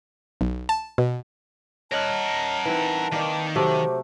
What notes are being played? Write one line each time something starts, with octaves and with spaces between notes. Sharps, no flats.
B1
A5
B2
A#4 C#5 D#5 F#5 A5 F6
E3 C4 D#4 B4
D#3 A#3 D5
C3 F#3 A3 C5 D6